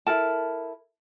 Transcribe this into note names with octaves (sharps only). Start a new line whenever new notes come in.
E4 A4 A#4 A5